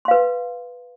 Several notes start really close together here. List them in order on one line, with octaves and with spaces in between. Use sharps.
C6 F5 B4